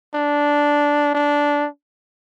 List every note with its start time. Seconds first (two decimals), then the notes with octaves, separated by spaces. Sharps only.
0.15 D4
1.15 D4